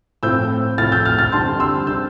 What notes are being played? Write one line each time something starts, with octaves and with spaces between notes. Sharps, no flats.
A2 F3 C4 E6 G6
A2 F3 C4 F6 A6
E6 G6
F6 A6
F6 A6
D3 G3 C4 A5 C6
C6 E6
D3 G3 C4 E6 G6